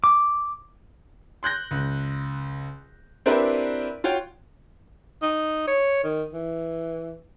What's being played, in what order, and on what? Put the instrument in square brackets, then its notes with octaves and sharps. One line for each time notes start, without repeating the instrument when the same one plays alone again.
[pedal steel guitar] D6
[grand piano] C6 F#6 G6 A#6
C#2
C4 D4 E4 G4 A#4 B4
F4 F#4 C#5 G5
[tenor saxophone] D#4
C#5
D#3
E3